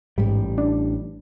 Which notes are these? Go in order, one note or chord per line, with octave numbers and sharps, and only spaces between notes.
A1 G#2 G3
D4